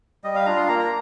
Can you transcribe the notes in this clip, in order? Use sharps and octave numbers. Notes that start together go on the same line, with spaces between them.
G3 D#5
F5
D4 F4 A#5
C6
A#3 A#5
A#5